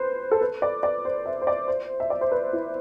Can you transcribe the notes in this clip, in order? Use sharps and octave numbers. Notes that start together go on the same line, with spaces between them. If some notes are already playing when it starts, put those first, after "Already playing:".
Already playing: B4 C5
A4
B4
D5
D5
C5
E5
C5
D5
C5
E5
D5
C5
B4
E4